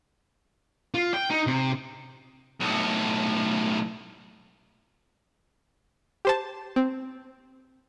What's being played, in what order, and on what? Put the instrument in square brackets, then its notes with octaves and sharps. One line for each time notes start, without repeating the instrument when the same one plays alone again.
[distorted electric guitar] F4
G5
D#4
C3
B1 A2
[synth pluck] G4 C5 A5
C4